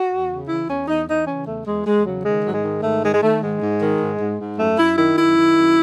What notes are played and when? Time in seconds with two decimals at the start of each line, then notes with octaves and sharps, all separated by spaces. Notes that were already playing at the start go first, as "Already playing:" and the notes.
Already playing: F#4
0.09 E2
0.29 C#3
0.48 E3 E4
0.68 E2 C#4
0.87 E2 D#4
1.07 E3 D#4
1.27 C#3 C#4
1.46 E2 A3
1.65 E2 G#3
1.85 E2 G#3
2.04 C#3 F#3
2.24 D#3 G#3
2.44 G#2 F#3
2.53 G#3
2.63 D#3
2.82 G#2 A3
3.02 D#3 G#3
3.13 G#3
3.22 D#3 A3
3.41 G#2 G#3
3.61 G#2
3.81 D#3
4.00 G#2
4.19 G#2
4.39 G#2
4.58 F#2 A3
4.77 F#2 E4
4.97 D#3 E4
5.17 F#2 E4
5.36 D#3
5.56 F#2